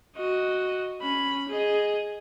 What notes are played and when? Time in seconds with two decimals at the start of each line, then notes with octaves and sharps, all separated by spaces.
0.16 F#4 D#5
1.02 C#4 B5
1.49 G#4 D#5